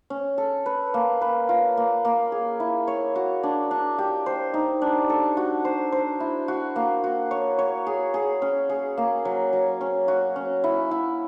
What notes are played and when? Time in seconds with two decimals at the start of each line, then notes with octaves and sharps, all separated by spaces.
0.10 C#4
0.38 A4
0.66 B4
0.94 A#3
1.21 B4
1.49 F4
1.77 A#3
2.05 A#3
2.32 G#4
2.60 E4
2.88 C#5
3.16 F#4
3.43 D4
3.71 D4
3.98 G4
4.26 C5
4.54 D#4
4.82 D4
5.10 A4
5.37 F#4
5.65 C5
5.92 C5
6.20 E4
6.48 F#4
6.76 A#3
7.04 F#4
7.31 C#5
7.59 C#5
7.87 G#4
8.14 G#4
8.42 C#4
8.69 G#4
8.97 A#3
9.25 F#3
9.53 F#3
9.81 C#4
10.08 F#4
10.36 C#4
10.64 E4
10.91 E4